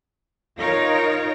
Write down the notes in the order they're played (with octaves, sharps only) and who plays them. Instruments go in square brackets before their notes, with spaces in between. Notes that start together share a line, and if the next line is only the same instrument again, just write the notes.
[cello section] D#4 F4 A#4 C#5